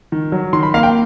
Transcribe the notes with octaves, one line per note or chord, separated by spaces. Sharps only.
D#3
F#3
D#3 C6
B5
A#3 F5
G5